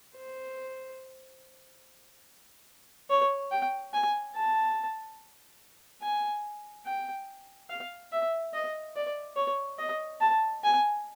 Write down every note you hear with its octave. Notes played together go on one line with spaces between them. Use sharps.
C5
C#5
G5
G#5
A5
G#5
G5
F5
E5
D#5
D5
C#5
D#5
A5
G#5